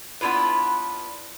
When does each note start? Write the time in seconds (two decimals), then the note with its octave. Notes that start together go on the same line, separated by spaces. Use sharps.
0.21 B3 D4 E4 F4 B4